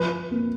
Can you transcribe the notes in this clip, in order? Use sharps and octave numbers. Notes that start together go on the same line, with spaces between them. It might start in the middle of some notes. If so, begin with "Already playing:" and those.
Already playing: F3 B4
A#3